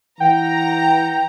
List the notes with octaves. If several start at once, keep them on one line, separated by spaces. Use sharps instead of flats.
E3 F#5 G5 A#5